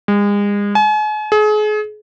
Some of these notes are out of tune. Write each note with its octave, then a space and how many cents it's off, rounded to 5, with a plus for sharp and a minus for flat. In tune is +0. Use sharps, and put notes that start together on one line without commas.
G#3 -35
G#5 +40
G#4 +35